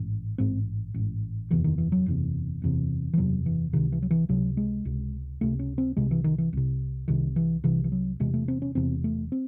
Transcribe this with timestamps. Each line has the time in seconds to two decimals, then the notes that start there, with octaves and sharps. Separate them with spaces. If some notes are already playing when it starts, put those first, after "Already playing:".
Already playing: A1 G#2
0.38 A1 G#2 C4
0.94 A1 G#2
1.50 F#1 E2 C3 E3
1.64 D#3
1.78 E3
1.92 F#3
2.06 F#1 E2 C3
2.62 F#1 E2 C3
3.14 E3
3.18 F#1 E2 C3 F#3
3.46 E3
3.73 C#2 C3 D#3
3.92 E3
4.02 F#3
4.11 E3
4.29 C#2 C3 F#3
4.57 G#3
4.85 C#2 C3
5.41 C#2 C3 A3
5.59 C#4
5.78 C4
5.97 C2 C3 G#3
6.11 E3
6.24 D#3
6.38 E3
6.53 C2 C3
7.08 C2 C3 D#3
7.36 E3
7.64 C2 C3 E3
7.84 E3
7.92 F#3
8.20 E1 E2 C3 G#3
8.34 A3
8.48 C4
8.62 C#4
8.75 E1 E2 C3 C4
9.04 A3
9.32 C4